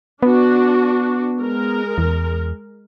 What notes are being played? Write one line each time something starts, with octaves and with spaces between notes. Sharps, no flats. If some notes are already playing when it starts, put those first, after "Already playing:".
B3 D4 F#4
G#3 A#4
E2